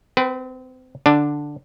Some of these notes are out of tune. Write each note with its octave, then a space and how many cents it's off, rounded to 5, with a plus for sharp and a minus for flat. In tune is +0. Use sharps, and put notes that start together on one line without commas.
C4 -30 B4 +0
D3 +0 D4 +0